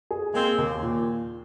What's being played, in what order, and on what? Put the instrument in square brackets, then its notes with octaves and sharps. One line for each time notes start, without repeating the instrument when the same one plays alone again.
[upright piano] G#4
[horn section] G#3 C4 [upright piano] A#3
[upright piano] D#2
A#2